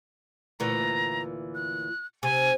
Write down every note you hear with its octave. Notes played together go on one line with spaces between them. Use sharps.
D2 A#2 E3 A#5
F#6
C3 G#5